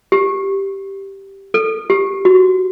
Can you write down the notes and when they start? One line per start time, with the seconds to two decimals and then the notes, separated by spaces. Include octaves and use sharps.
0.12 G4
1.54 A4
1.90 G4
2.25 F#4